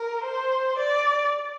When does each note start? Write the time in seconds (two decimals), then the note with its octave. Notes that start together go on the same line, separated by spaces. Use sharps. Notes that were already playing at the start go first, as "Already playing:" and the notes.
Already playing: A#4
0.24 C5
0.78 D5